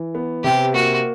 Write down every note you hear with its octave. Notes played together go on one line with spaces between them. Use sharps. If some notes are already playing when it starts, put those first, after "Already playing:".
Already playing: E3
B3
C3 G4
A#3 F#4